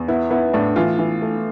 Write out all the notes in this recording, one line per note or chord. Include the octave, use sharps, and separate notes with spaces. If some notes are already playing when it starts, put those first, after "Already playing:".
Already playing: E2
B3 E4
B3 E4
A2 D4
E3 F4
E3
A3